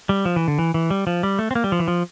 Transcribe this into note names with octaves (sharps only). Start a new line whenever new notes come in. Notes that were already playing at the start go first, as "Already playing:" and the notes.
G3
F3
E3
D3
E3
E3
G3
F3
G3
A3
C4
A#3
G3
F3
E3
F3